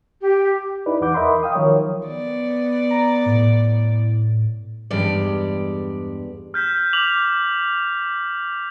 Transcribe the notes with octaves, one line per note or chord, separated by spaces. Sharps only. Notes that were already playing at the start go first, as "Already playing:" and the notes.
G4
D#4 E4 B4 D5
E2 E3 F#5 D6 G6
A#4 D#5 E5 B5 C6
F5 G5 D#6
D#3 F3 F#3 A#4 C#5
B3 D5
A#5
A2
E2 G2 G#3 G4 D5
F6 G6 B6
D6 F7 F#7